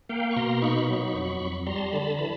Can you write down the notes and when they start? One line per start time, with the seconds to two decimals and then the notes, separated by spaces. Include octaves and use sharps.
0.09 A#3 F5 G5
0.31 C#6
0.36 B2 A#5 C6
0.55 C6
0.62 D#4 B5 C#6
0.89 F#3
1.14 F2
1.41 F2
1.67 G3 A#5 C6
1.76 A5
1.85 A#5
1.93 D3 A5 B5
2.14 A#5
2.19 E3 A5 B5